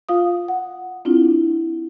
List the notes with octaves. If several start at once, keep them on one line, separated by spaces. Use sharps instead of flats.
F4 F5 D#6
F#5
C4 D4 E4 F4